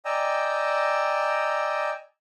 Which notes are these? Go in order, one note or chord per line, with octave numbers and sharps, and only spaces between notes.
D5 D#5 G5 G#5 A#5 E6